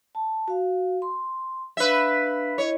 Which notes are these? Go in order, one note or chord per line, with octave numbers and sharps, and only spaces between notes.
A5
F#4 F5
C6
D4 B4 E5 F5
E4 C#5 D#5